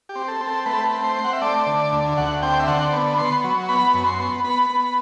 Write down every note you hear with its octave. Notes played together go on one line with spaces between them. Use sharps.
G4
C4
A4
C4
A4
A3 B4
A4
B4
C4
C5
C4
F#5
E5
A3 D5
D3
D2
D2 F#5
C4 G5
E5
D3 F#5
B3
B3 C6
F#3
B3 B5
F#2
C6
B3
B3 B5
B3